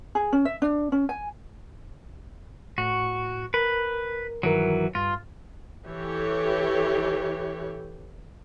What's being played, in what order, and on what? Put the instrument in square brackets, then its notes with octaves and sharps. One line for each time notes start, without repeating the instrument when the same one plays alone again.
[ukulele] G#4
C#4
E5
D4
C#4
G#5
[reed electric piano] A2 [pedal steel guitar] F#4
[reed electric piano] A#4 [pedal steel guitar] B4
[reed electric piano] G2 D#3 A#4 [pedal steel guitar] E3 F#3
[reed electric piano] G2 [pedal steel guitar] F4
[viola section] E3 G4 A4 C#5